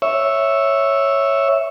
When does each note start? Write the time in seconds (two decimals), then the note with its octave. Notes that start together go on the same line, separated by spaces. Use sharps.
0.02 C#5 E5